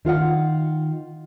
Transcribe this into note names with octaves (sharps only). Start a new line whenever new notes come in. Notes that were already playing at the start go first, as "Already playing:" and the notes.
D#3 F4 F5 F#5